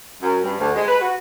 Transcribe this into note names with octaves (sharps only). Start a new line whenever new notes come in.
F#2
G2
D2
G#3
B4
F#4